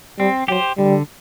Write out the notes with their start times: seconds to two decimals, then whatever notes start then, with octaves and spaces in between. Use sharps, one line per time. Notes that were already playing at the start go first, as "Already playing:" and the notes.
0.19 G3 C4
0.48 F#3 G4 C5
0.78 D3 G3